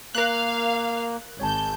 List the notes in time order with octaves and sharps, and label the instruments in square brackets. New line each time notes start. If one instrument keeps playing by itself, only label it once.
[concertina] A#3 [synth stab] A#4 F#6 [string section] F5
[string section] G#1 G6 [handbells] C#5 G#5 A5